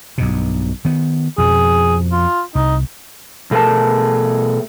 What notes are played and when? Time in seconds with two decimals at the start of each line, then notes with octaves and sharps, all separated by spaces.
0.18 B1 G2 B2
0.85 D#3 B3
1.38 F2 B2 F3 G#4
2.12 F4
2.55 C2 D#4
3.51 B2 A3 G#4 A#4 A5